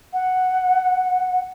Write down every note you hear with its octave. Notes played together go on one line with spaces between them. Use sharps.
F#5